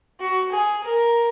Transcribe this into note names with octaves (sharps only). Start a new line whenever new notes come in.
F#4
G#4
A#4